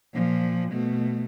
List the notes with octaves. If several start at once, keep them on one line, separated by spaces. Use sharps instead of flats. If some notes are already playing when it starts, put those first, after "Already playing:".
A#2 F3
B2 A3